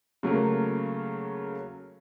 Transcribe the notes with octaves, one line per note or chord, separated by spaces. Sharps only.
C#3 F#3 A3 A#3